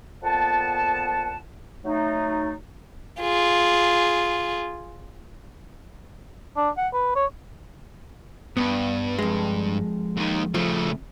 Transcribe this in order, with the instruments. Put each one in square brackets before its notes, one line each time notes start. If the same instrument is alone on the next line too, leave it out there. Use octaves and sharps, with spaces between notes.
[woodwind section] F2 A#2 B3 F#5 A5
F#3 A3 D#4
[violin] F4 G#4
[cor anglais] D4
F#5
B4
C#5
[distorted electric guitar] G2 [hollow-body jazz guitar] B3
[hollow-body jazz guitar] F2 G#3
[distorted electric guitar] D#2 D#3
[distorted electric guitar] C#3 A3 [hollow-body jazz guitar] F3